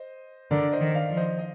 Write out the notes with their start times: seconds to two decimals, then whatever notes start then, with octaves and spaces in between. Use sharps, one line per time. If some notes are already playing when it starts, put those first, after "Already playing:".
Already playing: C5 D#5
0.51 D3 A#4 D5
0.72 C5 D#5
0.80 D#3
0.94 D5 F5
1.10 F3
1.17 C5 D#5
1.39 D#5